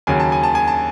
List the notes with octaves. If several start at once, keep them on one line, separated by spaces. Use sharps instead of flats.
D#2 C#3 F#3 G#5
A5
G#5
A5
G#5
A5